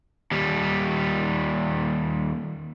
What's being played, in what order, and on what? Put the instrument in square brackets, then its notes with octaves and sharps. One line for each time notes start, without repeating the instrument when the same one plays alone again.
[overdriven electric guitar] D#2 G3